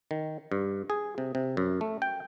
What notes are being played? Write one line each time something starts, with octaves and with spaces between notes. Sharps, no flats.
D#3
G2
G#4
C3
C3
F#2
A3
G5